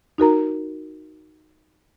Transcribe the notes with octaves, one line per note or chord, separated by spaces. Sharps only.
D#4 F#4 A#4 A#5